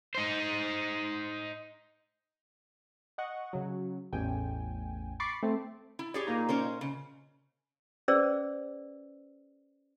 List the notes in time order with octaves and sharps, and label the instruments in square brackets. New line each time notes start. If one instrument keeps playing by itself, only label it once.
[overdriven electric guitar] D#4 C5
[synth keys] D#5 F#5 C#6
C#3 F#3
A1 E2 G5 G#5
B5 C#6 D6 A6 C7
A3 C4
[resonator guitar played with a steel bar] E4
[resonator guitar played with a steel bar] G4 G#4 C#5 [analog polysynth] D5
[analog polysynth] A#2 A#3 D#4
[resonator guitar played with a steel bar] C#4 A#4 C5
C#3
[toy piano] C#4 G#4 B4 C5 D5 E6